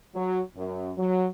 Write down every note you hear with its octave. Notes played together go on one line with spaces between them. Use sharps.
F#3
F#2
F#3